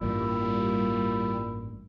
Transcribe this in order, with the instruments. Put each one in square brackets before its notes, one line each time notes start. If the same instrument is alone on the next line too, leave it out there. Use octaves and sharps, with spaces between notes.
[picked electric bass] A1 G2 [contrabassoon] A#2 [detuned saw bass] G3 [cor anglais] E4